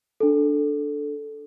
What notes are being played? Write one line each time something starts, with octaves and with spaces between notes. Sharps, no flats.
D4 A4